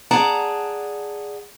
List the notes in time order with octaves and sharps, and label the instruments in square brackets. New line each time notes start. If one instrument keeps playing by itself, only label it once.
[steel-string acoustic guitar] G#4 D5 F#5 A5 A#5